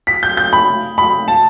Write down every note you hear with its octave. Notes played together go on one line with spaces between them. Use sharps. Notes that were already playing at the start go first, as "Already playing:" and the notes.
B6
G6
G6
B5
B5
A5